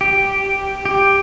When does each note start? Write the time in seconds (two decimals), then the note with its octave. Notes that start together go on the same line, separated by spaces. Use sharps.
0.01 G4
0.85 G4